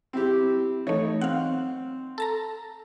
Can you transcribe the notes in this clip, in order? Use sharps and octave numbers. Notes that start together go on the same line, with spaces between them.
C4 E4 G4
E3 A3 D#4 C#5
C4 F5 F#5
A4 A5 A#5